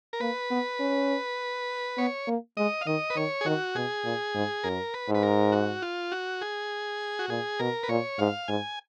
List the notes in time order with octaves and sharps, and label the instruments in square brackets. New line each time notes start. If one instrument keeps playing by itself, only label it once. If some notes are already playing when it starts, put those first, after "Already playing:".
[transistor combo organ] A#4
[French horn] A#3 [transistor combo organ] B4
[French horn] B3
C#4
[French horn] B3 [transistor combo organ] C#5
[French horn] A#3
[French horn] G#3 [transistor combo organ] D#5
[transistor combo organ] F5
[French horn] D#3 [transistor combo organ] D#5
[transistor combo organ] B4
[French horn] D#3 [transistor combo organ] C#5
[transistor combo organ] G#4
[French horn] D#3 [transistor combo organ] F#4
[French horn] B2 [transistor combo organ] G#4
[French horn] A#2
G#2
[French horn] F#2 [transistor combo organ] A#4
[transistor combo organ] B4
[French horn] G#2
[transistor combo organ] B4
A#4
F#4
F4
F#4
G#4
F#4
[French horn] A#2 [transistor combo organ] G#4
[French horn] B2 [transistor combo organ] A#4
[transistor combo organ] B4
[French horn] A#2 [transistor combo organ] C#5
[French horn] G#2 [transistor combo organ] F5
[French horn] G#2 [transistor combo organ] G#5